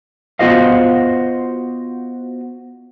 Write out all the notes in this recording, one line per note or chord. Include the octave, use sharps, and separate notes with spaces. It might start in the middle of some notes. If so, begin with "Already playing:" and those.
B3 F4 F#4 C5 D#5 F5